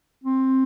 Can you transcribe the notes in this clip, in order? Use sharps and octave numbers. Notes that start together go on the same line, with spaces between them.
C4